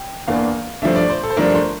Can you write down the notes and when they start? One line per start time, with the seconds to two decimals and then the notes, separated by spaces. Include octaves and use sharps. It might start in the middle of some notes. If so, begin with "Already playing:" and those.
Already playing: G5
0.28 E2 E3 A#3 D4 F5
0.82 G2 F3 A3 D4 E5
0.96 D5
1.10 C5
1.23 A4
1.30 C5
1.37 G2 F3 A3 D4 A#4
1.55 C5